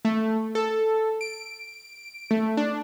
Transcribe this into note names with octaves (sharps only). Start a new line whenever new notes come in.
A3
A4
D7
A3
D4